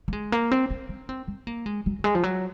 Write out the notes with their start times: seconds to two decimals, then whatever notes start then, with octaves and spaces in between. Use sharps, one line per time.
0.08 A#3
0.13 G#3
0.32 A#3
0.51 C4
0.71 C4
0.89 C#4
1.09 C4
1.27 C4
1.47 A#3
1.66 G#3
1.86 F#3
1.99 F#3
2.04 G#3
2.15 F3
2.23 F#3